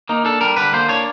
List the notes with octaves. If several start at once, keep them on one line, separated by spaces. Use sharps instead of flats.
A#3 D#4
D4 A4
G3 A#4
D3 B4
A#3 C5
D4 C#5